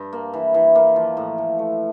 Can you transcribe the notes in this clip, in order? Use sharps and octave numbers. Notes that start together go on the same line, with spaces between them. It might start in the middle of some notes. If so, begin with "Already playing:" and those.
Already playing: G2
A#3
E3
E3
A#3
F3
A2
A2
A3